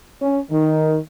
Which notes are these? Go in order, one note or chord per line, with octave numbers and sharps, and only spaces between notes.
C#4
D#3